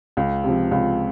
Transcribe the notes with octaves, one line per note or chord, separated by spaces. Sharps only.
C#2
C3 F3
C#2